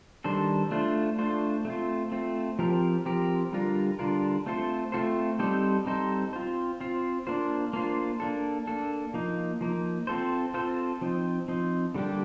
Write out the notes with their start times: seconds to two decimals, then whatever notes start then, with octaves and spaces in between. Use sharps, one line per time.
0.24 D#3 G3 D4 A4 C5
0.71 A3 D4 F4 C5
1.18 A3 D4 F4 C5
1.65 A3 C4 F4
2.12 A3 C4 F4
2.59 F3 C4 G4 A#4
3.05 F3 C4 G4 A#4
3.52 D3 G3 D4 F4 A#4
3.99 D3 G3 D4 F4 A#4
4.46 A3 C4 F4 A4 C5
4.92 A3 C4 F4 A4 C5
5.39 G3 C4 D#4 A4 C5
5.86 G3 C4 D#4 A4 C5
6.33 C4 F4 C5
6.80 C4 F4 C5
7.27 A#3 D4 F4 C5
7.73 A#3 D4 F4 C5
8.20 A#3 D4 A4
8.67 A#3 D4 A4
9.14 F3 A#3 D#4
9.61 F3 A#3 D#4
10.07 C4 F4 A4 C5
10.54 C4 F4 A4 C5
11.01 F3 C4 D#4
11.48 F3 C4 D#4
11.94 D3 G3 A#3 D4 G4